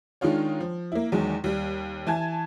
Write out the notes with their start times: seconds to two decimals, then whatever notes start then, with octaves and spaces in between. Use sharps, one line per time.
0.21 D#3 G#3 D4 D#4 F4 C#5
0.60 F3
0.92 A#3 E4
1.12 E2 D#3 F#3 G#3
1.44 D#2 G3
2.07 E3 G#5 A5 G#6